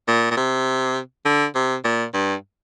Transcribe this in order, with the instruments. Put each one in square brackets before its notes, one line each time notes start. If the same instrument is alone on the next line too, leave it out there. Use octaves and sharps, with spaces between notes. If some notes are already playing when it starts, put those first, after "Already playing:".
[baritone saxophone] A#2
A#2
C3
D3
C3
A#2
G2